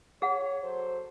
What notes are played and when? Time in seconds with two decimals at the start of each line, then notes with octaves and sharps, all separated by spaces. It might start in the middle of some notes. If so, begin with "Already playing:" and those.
0.22 G#4 C#5 F#5
0.62 F#3 A4 C5